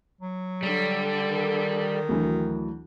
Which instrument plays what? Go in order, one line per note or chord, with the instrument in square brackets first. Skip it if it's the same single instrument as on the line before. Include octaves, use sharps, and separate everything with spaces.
[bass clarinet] F#3
[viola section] D3 A4 [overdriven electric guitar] G3
[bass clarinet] D#3
[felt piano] D2 E3 F#3